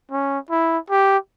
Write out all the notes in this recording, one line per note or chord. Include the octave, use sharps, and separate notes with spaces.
C#4
E4
G4